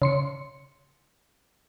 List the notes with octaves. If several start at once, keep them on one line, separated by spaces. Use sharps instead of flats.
C#3 C6 C#7